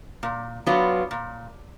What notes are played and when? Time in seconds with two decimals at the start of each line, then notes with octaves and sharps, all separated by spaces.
0.23 A#2
0.67 F#3 B3 D4 F4
1.11 A#2